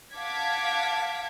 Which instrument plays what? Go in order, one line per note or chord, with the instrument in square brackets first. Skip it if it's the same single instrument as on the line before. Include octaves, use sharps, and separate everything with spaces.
[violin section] F5 F#5 A5 D6 G#6 B6